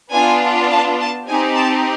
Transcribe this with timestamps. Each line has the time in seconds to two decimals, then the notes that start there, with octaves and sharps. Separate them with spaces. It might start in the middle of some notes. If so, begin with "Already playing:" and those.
0.12 B3 D4 F4 G#5
0.70 A5
0.99 A5
1.27 C4 D#4 G4 G#5
1.56 A5